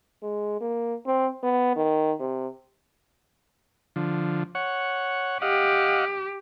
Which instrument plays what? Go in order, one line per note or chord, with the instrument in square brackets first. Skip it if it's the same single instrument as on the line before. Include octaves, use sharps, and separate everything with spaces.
[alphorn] G#3
A#3
C4
B3
D#3
C3
[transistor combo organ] D3 F3
C#5 F#5
[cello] G4 [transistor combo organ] D#5 F5 F#5